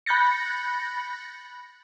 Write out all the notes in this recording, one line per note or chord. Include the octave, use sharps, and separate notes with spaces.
B5 F#6 G6 A6 A#6 C#7